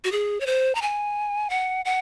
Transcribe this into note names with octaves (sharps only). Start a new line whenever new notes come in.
F#4
G#4
C#5
C5
A#5
G#5
F#5
F#5